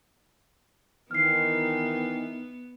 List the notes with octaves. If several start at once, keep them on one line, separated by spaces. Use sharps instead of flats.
D#3 E3 B3 F6 C7